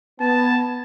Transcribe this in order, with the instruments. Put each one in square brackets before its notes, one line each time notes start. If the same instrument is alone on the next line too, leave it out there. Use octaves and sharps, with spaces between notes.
[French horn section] B3 [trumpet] A5